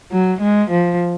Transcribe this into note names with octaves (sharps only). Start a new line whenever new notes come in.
F#3
G#3
F3